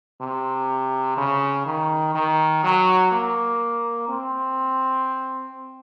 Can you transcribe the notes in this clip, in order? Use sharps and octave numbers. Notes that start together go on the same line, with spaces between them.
C3
C#3
D#3
D#3
F#3
A#3
C4